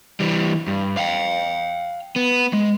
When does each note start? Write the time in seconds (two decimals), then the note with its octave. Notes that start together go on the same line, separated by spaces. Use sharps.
0.20 E3 G3
0.67 G2
0.97 F5 G5
2.16 B3
2.53 G#3